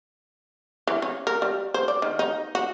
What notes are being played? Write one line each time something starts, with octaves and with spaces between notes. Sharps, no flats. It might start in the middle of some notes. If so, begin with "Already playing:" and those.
E3
C#4
A#4
G3
C5
D5
D#3
D#4
F#4